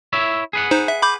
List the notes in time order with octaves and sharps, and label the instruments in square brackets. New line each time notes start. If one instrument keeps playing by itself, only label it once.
[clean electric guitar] E4 C#5 E5
G#4 B4 F#5
[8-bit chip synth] D#4 C5
E5
B5 D6 G6